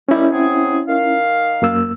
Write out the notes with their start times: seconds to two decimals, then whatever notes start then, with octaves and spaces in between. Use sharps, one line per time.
0.09 D#3 G3 C#4 E4
0.31 F#3 C4 G#4
0.88 D#3 F5
1.62 F#2 A#3 E6